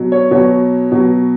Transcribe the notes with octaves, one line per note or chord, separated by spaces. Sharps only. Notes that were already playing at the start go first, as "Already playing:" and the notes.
Already playing: B2 F#3
C#5
B2 F#3 C#5
B2 F#3